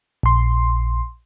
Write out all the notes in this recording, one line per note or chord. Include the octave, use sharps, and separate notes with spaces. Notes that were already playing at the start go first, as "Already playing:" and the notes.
A#1 C6